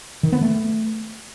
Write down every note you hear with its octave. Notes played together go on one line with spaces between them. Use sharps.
D#3
B3
A3